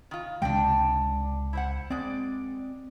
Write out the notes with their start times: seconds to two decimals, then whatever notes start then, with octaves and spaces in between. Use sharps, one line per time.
0.11 D#3 F4
0.42 C#2 C3 G#3 D4 G5
1.53 E4 C5 F#5
1.90 G#3 C4 D5